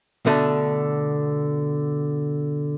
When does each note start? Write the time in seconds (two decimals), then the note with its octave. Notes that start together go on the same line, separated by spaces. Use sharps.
0.26 B2 D3 A3